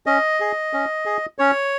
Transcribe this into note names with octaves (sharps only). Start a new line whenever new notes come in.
C#4 D#5
G#4
C#4
G#4
C#4 C#5